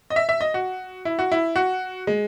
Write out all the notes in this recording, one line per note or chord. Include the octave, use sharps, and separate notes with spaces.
D#5
E5
E5
D#5
F#4
E4
F#4
E4
F#4
G#3